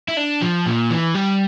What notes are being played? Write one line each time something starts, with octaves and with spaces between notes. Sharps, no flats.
E4
D4
F3
A#2
E3
G3